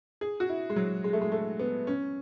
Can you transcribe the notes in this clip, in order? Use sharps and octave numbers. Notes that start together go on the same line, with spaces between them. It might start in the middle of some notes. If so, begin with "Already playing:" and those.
G#4
F#4
E4
G#3
F#3
G#3
A3
G#3
A3
B3
C#4